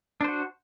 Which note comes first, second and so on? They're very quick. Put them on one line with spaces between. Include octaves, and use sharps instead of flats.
D4 C5 F#4